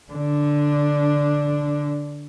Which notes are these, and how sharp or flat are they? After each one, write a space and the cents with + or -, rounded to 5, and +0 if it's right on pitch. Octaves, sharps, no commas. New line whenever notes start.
D3 +0 D4 +0